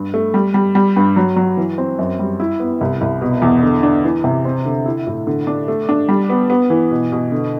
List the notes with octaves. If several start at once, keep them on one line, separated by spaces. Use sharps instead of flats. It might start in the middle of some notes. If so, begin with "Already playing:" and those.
Already playing: G2
A3
G3
G3
G3
G2
F#3
F#3
E3
C4
F#2
G3
E4
B3
C2
C2
B2
E2
D3
D4
E3
C3
C4
D3
E4
A2
D3
D4
A3
D4
G3
B3
B3
E3
B2
B2
D3